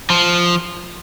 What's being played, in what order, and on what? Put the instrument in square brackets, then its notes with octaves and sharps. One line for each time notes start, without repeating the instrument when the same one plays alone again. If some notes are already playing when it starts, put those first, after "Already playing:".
[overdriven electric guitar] F3